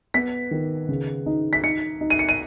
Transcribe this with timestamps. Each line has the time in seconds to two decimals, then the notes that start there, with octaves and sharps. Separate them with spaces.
0.14 B3 B6
0.51 D#3
0.88 C#3
1.26 D#4
1.53 B6
1.63 D#4 C#7
2.01 D#4
2.10 D#7
2.19 C#7
2.29 D#7